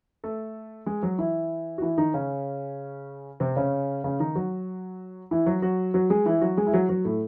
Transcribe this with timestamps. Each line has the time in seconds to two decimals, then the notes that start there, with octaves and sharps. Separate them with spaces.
0.24 A3 A4
0.86 G#3 G#4
1.02 F#3 F#4
1.18 E3 E4
1.78 F#4
1.82 E3 E4
1.98 D#3 D#4
2.14 C#3 C#4
3.40 C3 C4
3.56 C#3 C#4
4.04 C#3 C#4
4.20 D#3 D#4
4.35 F#3 F#4
5.31 E3 E4
5.46 F#3 F#4
5.62 F#3 F#4
5.94 F#3 F#4
6.10 G#3 G#4
6.26 E3 E4
6.41 F#3 F#4
6.57 G#3 G#4
6.67 E4
6.73 F#3 F#4
6.89 F#3 F#4
7.05 A2 A3